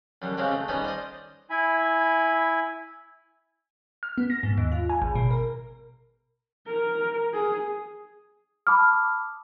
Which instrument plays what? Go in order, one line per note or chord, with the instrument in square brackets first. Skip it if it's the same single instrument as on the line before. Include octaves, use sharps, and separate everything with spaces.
[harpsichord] F#2 D3 G3
C#3 G#3 C4 C#4 F#4 G4
A3
G3 B3 C#4 D#4 G4 G#4
C5 D5 D#5
[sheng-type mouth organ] E4 G#5 B5
[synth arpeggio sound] F6
B3
A#6
G#2
D#2
F4
G#5
G#1
B2
A#4
[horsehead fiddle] A#4
G#4
[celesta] A5 B5 D6 D#6 F6